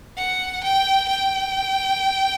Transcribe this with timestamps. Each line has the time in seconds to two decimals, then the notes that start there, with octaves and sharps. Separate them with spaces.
0.17 F#5
0.63 G5
1.08 G5